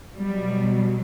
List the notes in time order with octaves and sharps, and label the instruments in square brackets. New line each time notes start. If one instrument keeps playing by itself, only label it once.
[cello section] B2 F#3 G3